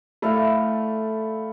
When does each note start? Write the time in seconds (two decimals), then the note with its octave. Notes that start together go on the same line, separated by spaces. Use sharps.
0.22 A3 E4 A4 D5 F5